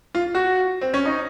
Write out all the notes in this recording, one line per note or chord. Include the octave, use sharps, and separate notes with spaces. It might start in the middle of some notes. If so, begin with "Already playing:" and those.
F4
F#4
C4
C#4
D#4